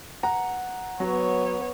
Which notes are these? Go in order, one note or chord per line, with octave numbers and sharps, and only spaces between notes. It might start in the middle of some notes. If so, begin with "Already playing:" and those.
F#5 A#5
F#3 B3 C#5